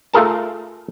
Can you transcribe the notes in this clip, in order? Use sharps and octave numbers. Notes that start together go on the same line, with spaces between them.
A3 F4 G#4 A#4 A5